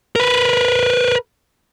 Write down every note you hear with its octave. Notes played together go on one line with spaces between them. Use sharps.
A#4 B4